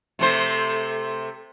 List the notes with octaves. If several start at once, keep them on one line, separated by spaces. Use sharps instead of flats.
C3 A3 C5